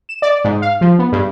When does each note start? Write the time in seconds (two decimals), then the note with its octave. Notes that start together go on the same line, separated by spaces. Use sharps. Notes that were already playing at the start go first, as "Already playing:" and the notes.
0.09 E7
0.22 D5
0.44 G#2
0.62 F5
0.81 F3
0.99 B3
1.12 G2